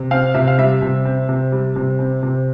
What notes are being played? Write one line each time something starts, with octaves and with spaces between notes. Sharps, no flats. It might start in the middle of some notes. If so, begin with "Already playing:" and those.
Already playing: C3
C4 F5
C3 E5
F5
G3 E5
C3
C4
C3
G3
C3
C4
C3